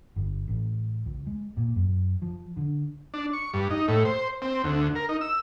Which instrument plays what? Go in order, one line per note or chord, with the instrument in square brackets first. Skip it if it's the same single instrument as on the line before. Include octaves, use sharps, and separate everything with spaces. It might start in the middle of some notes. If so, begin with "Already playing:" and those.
[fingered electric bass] G1
A1
C#2
G#3
A#2
F#2
F3
D3
[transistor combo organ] D4
C#6
G2
D#4
A2
C5
C4
D2
A#4
D#4
E6